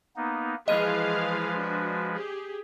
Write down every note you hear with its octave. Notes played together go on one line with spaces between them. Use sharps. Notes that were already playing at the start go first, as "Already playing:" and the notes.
A#3 B3 D#4
E3 F3 G#3 G#4 B4 D#5 F5 D#7
D4 F#4
G4 G#4